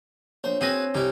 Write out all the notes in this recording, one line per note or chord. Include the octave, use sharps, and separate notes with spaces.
A#1 C5 C#5
C4 F#4 G#4 B4 G#5 A#6
C2 D#4 G4